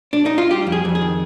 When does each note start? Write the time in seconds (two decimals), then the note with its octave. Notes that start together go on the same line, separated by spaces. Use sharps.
0.13 D4
0.26 D#4
0.38 F4
0.50 G3 G4
0.67 F2
0.72 G#4
0.85 F2
0.95 G#4
1.02 D#3